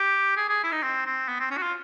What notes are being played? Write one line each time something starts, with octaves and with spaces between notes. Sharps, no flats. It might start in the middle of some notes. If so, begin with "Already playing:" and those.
Already playing: G4
G#4
G#4
E4
D#4
C4
C4
B3
C4
C#4
F#4
F4